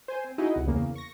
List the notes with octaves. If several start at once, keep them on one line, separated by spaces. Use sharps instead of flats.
C5 G#5
C4
D#4 E4 F#4 G#4 D#5 E5
C#2 C3 E4 F#5
E2 C#3 A#3
C#6 A#6